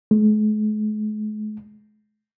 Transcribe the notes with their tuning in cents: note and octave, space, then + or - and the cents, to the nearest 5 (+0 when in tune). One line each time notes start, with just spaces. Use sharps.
G#3 +45